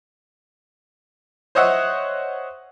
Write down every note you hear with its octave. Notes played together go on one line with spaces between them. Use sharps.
C5 C#5 D#5 E5 F#5